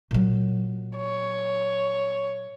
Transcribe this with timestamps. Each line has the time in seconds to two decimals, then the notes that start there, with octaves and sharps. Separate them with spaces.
0.11 A#2 F#3
0.97 C#5